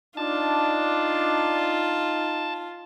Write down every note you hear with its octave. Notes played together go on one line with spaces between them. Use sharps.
D4 D#4 F4 A5